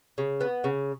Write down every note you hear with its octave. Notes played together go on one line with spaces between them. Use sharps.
C#3
B3
C#3